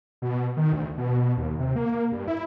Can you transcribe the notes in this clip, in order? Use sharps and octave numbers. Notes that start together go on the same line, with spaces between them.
B2
D#3
D2
B2
B2
D#2
C3
A#3
G2
E4